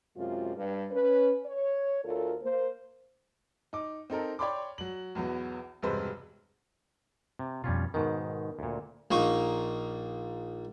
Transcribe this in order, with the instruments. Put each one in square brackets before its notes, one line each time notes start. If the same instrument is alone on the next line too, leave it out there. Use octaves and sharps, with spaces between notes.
[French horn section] F#2 C3 G#3 F4
G2
C#4 B4
C#5
D2 F4 A4 A#4
A#3 C5
[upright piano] D#4 D6
C4 D#4 A4 A#4
C#5 D5 G5 B5 C6 D6
F#3 F#7
B1 E2 F#3 B3
E1 G2 C3 G#3 B4 C5
[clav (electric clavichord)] C3
[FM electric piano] F2 B2 [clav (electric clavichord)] G3 C#4 F4
[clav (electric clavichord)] G#2 B2 D#3 [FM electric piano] B3 A#4
[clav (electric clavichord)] D2 A#2
[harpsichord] A#1 A#3 D#4 C#6